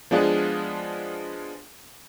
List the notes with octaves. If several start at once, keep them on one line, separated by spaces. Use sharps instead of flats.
F3 G#3 B3 D4 F4 G#4